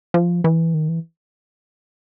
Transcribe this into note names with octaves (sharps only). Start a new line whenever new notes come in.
F3
E3
D#3
E3